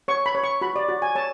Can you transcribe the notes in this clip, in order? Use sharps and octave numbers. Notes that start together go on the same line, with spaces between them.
C#5 C#6
B5
C#5
C#6
F#4 B5
D5
F#4
G#5
C#5 A5